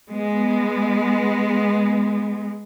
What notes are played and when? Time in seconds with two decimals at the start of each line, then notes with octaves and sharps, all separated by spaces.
0.10 G#3 B3